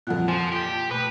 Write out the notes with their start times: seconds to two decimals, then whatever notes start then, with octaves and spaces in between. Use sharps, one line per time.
0.07 F2 A#2 A4 F#5 F#6
0.28 F3 G#5
0.52 G4
0.91 B2 A3 B4